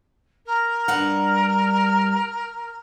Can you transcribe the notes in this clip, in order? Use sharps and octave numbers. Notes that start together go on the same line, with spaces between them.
A#4
G2 G3 F#5